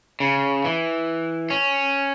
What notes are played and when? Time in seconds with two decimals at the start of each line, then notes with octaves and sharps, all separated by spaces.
0.20 C#3
0.65 E3
1.50 C#4